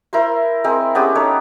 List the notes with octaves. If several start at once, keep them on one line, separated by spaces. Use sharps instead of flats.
E4 A#4 C5 C6
G#3 C4 A#4
B3 C#4 G4 G#4
D#4 A4 C#5